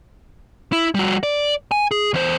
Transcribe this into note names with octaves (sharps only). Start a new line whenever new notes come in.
E4
G3 F#4
D5
G#5
G#4
E2 C5